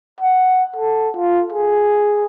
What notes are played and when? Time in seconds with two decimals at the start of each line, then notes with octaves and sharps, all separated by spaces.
0.21 F#5
0.76 A4
1.16 F4
1.52 G#4